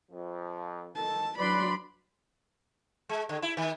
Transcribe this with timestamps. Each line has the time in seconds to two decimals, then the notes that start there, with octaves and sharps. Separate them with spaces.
0.11 F2 F3
0.95 D#3 A4 A5
1.38 F#3 D4 B4 D5 B5 C6
3.09 G#3
3.29 D3
3.42 E4
3.57 D#3